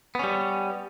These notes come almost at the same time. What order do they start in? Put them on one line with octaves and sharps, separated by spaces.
B3 C#4 G3